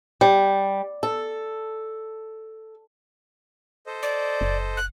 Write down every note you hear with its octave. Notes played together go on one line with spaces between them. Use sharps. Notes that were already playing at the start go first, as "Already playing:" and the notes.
G3
A4
A4 C5 D#5
D5
F#1
F#6